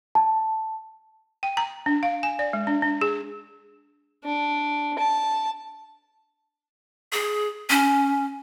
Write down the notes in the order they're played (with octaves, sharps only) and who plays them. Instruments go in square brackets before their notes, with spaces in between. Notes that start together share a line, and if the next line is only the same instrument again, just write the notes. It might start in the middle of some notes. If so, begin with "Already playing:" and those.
[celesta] A5
[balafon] G5
A#5
D4
F5
G#5
D5
G#3
D4
D4
G#4
[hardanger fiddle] D4
A5
[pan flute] G#4
C#4